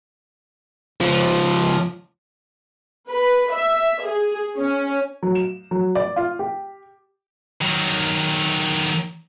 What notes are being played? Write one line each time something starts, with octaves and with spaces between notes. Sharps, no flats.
C#2 F3
B4
E5
G#4
C#4
F#3
E7
F#3
D5
F4
G4
D#3 F#3